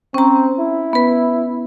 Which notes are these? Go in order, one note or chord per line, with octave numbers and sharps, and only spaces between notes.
C4 C#4 A#5
E4
B3 B4